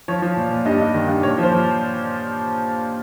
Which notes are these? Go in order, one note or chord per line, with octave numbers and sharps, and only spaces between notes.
F3 C#5
F3
A#2
A#2
G2 D#5
G2
D#3
G2
A#2 C#5
F3
C5
F3